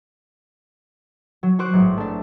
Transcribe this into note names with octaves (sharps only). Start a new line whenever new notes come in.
F#3
F#4 C5 D6 F#6
A1 G#2 F#3
A3 D4